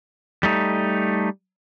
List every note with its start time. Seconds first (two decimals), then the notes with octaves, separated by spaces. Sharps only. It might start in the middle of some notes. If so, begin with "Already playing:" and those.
0.43 G3 A3 D#4